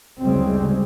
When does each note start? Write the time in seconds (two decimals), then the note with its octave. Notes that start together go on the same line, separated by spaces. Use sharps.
0.21 F#1 D2 C#3 G3 G#3 C4